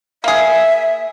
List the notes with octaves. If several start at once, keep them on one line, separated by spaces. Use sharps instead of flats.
A#3 G#4 E5